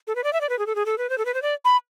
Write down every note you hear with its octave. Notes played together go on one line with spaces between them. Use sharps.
A4
B4
D5
E5
D5
B4
G#4
A4
G#4
A4
B4
C5
A4
B4
C5
D5
B5